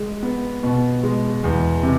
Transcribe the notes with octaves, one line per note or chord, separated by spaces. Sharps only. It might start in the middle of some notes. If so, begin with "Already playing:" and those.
Already playing: G#3
B3
B2
G#3
E2
C3